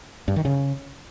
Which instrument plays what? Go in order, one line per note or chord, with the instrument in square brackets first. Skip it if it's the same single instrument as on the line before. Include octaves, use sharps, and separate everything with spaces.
[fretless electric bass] G2
D#3
C#3